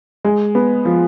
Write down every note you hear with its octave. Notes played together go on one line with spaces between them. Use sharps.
G#3
B3
F3